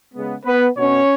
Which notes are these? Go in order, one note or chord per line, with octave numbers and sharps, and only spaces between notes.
C#3 G#3 B3
B3 B4
B2 B3 C#4 C#5